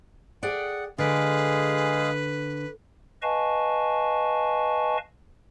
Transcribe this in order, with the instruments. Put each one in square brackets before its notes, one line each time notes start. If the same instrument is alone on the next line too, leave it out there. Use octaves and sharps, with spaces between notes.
[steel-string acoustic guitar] G#4 D5 G5 [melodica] F#5
[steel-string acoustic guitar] D3 [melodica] G#3 G#4 F5 [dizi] B4
[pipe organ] B4 D#5 F5 G#5 A5 C#6